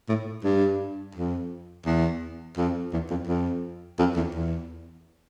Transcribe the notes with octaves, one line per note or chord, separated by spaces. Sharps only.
A2
G2
F2
E2
F2
E2
F2
F2
F2
E2
E2